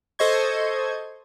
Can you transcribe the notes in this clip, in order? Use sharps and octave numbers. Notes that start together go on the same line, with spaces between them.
A4 C5 D#5 C#6 G#6